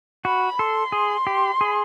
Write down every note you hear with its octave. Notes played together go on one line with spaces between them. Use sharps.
F#4 B5
A4 C6
G#4
G4
G#4